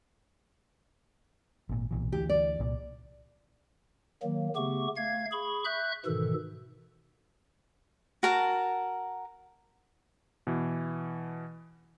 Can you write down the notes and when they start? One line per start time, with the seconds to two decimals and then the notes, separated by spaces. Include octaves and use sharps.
1.69 G#1 A#2
1.91 B1 A#2 E3
2.12 D2 E3 G4
2.29 D5
2.60 C2 A#2
4.23 D#3 F#3 A#3
4.56 C#3 A3 B3 G4 C#6
4.96 A3 F5 G#6
5.32 G#4 B5 C#6
5.64 E5 C#6 F#6 G6
6.06 G#2 B2 D#3 E3 A4
8.23 F#4 A#4 A5
10.47 B2 E3